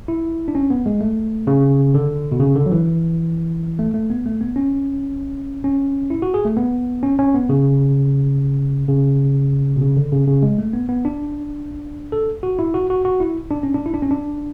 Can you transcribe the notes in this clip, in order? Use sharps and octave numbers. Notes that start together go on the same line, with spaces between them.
E4
D4
C#4
B3
G#3
A3
C#3
D3
B2
C#3
D3
F#3
E3
A3
A3
B3
A3
B3
C#4
C#4
E4
F#4
G#4
A3
B3
C#4
C#4
B3
C#3
C#3
B2
C#3
D3
C#3
C#3
G#3
A3
B3
B3
D4
A4
F#4
E4
F#4
F#4
F#4
E4
D4
C#4
D4
E4
D4
C#4
D4